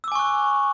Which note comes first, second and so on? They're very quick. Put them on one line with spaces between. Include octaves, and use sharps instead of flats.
E6 D6 G#5 C#6 F#6